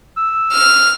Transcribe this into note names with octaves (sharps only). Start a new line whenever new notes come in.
E6
F6